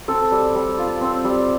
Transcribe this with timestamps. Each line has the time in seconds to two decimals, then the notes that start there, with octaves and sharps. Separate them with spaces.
0.08 C4 A4
0.32 G3
0.55 G3
0.78 F4
1.01 C4
1.24 G3